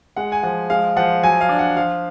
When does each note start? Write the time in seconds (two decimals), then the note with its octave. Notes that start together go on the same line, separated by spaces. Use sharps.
0.16 G#3 F#5
0.32 G#5
0.43 F3 F#5
0.70 G#3 F5
0.96 F3 F#5
1.23 F#3 G#5
1.41 F5
1.49 D4
1.59 F#5
1.76 F3 F5